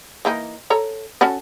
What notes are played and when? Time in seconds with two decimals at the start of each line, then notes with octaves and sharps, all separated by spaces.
0.25 E3 A#3 D#4
0.70 A4 C#5 A#5
1.21 C#4 F#4 A4